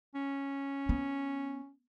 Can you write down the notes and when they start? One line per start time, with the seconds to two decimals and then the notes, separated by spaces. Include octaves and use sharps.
0.14 C#4
0.89 B3